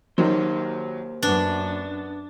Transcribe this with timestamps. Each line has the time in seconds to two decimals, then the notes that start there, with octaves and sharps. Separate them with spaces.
0.18 D#3 F#3 A#3 G4 C5
1.23 F#2 B3 D4